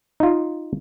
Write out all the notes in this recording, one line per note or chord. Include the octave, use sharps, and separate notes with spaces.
D#4 F4